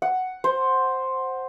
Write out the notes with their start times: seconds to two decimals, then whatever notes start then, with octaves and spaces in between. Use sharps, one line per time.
0.02 F#5
0.44 C5